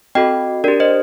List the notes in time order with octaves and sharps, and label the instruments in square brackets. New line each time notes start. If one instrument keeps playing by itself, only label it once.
[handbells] C4 F#4 A4 D#5 G5
D4 G4 A#4 D5
C5 D#5